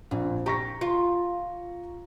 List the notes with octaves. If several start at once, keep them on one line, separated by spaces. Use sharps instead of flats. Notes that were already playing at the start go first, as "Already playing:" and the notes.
A#1 F2
G4 A#5 C#6 A#6
F4